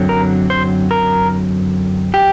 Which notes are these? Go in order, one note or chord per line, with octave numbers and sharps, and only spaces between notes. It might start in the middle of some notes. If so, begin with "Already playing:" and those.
Already playing: F#2 D3 F#3 C4
A#4
C5
A#4
G4